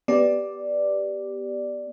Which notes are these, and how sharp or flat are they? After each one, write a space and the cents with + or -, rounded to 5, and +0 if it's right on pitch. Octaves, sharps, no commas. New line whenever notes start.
B3 +0 G4 +0 D5 +0